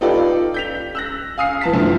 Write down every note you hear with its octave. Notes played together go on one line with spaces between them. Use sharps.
D#4 F4 G4 A4 B4 D5
G6 B6 F7
E6 F#6 A#6
F5 G#5 D#6 F6 C7
E3 A5 B6
G1 C2 D3 E3 F3